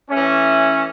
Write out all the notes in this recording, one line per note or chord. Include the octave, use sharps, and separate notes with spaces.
E3 A3 C#4